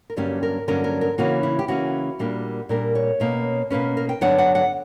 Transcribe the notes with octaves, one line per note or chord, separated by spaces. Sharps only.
A#4
G2 D3 F#3 A#3 C#4 G4
A#4
G2 D3 F#3 A#3 C#4 A#4
A#4
A#4
C#3 E3 A#3 C#4 F#4
E4
G4
C#3 E3 A#3 C#4 F#4
A#2 G3 A#3 D4
A#2 G3 A#3 D4 A#4
C#5
B2 A#3 C#4
B2 A#3 C#4 B4
A#4
G5
G2 D3 F#3 B3 D4 F#5
F#5
F#5